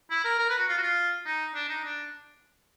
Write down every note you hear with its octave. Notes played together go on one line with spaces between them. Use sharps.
E4
A#4
A#4
B4
F#4
F4
F#4
F4
D#4
D4
D#4
D4